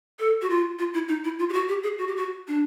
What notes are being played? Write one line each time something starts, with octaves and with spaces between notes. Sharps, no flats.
A4
F#4
F4
F4
E4
D#4
E4
F4
G4
F#4
G4
G#4
F#4
G4
F#4
D4